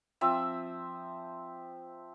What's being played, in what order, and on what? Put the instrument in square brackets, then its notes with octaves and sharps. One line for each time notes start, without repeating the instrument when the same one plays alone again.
[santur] F3 C4 E5 E6